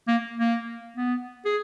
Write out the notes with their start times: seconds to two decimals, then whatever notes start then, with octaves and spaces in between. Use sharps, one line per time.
0.08 A#3
0.38 A#3
0.97 B3
1.45 G#4